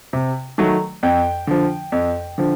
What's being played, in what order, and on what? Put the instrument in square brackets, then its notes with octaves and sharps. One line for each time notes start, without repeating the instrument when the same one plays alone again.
[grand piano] C3
D#3 F#3 A3
F2 G5
D3 F3
F2
D3 F3